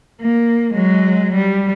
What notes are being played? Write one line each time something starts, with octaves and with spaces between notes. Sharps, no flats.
A#3
F#3 G#3
G3